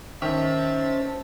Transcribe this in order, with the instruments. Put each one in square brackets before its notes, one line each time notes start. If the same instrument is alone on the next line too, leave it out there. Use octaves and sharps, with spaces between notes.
[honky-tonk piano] D#3 [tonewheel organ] C#4 C5 A5 [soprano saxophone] E5